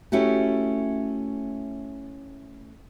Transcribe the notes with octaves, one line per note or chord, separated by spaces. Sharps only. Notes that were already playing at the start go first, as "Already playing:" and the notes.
A3 C#4 E4 F#4 G4